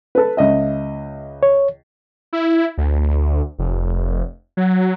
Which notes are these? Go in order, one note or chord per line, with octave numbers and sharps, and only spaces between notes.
A4 B4
C#2 D#5 E5
C#5
E4
D2
F1
F#3